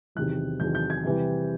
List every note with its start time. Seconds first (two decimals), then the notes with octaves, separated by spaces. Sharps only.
0.15 E2 C3 D#3 F#3 F#6
0.60 E2 C3 D#3 F#3 G6
0.75 G6
0.90 G#6
1.04 C3 E3 G3